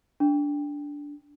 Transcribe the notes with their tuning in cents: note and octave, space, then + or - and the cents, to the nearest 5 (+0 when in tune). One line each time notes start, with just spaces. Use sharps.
D4 -10